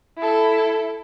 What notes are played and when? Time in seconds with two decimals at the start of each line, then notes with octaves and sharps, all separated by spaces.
0.18 E4 A4